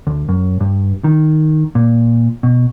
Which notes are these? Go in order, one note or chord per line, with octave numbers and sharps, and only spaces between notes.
D2
F#2
G2
D#3
A#2
B2